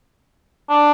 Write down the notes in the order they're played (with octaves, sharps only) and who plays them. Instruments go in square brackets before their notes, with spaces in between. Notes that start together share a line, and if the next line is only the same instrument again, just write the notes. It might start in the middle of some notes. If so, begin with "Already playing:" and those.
[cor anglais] D4